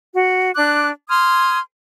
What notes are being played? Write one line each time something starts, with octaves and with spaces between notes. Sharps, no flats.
F#4
D4 D6 F#6
C6 D#6 F6 G#6